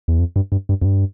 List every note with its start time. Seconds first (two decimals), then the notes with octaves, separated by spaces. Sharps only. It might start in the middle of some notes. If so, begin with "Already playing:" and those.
0.08 E2
0.19 F2
0.36 G2
0.52 G2
0.69 G2
0.82 F2
0.85 G2